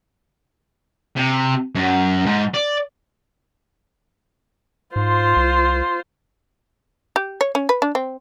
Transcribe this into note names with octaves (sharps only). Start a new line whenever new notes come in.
C3
F#2
G#2
D5
G#2 F4 C5
C2
G4
C#5
C#4
B4
D4
C4